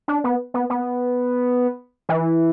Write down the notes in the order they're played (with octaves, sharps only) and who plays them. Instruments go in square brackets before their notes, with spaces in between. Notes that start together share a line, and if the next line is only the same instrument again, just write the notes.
[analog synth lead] D4
B3
B3
B3
E3